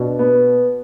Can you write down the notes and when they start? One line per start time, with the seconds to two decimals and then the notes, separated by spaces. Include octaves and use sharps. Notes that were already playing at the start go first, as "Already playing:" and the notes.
Already playing: B2 D4
0.19 B3